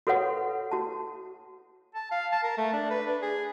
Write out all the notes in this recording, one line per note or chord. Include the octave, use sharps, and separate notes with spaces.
F#4 A4 B4 C#5 F#5
F#4 A5
A5
F5
A5
A#4
A3
D4
B4
D4
G#4